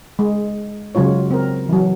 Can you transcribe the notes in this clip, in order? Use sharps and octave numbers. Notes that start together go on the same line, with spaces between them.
G#3
C#3 F#3 G#3 F4 C#5
C4 A#4
E3 F#3